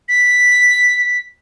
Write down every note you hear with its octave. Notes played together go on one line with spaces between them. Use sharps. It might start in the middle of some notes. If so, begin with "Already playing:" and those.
B6